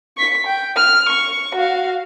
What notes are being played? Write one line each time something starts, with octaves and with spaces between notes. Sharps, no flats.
C#6 B6
G5
F6
C#6
F#4 F5